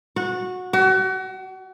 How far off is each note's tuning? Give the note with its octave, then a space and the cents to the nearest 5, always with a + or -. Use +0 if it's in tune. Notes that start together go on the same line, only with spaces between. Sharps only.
F#4 -15
F#4 +35